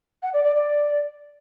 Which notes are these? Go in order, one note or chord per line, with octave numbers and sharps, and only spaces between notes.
F#5
D5
D5
D5